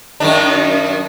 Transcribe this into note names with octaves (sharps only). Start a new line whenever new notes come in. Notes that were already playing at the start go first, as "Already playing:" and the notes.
F#2 D#3 D4